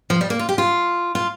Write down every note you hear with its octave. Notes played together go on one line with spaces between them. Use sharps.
F3
G3
A#3
F4
G4
F4
F4